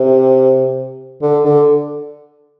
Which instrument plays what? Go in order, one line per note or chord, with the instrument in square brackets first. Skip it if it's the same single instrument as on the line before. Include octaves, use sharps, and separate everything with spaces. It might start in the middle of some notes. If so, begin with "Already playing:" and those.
Already playing: [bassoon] C3
D3
D3